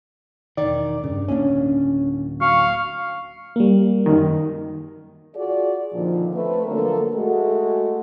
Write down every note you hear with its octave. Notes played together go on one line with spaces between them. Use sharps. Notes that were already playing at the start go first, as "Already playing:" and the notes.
E1 D#3 D5
G2 C#3
D1 A#3 C#4 D4
F#3 F5 C#6
G3 A#3
F#2 D#3
F4 F#4 G#4 D5
A#2 D3 D#3 F3
A3 C4 B4
D3 F3 F#3 A#3 A4 A#4
G#3 A3 F#4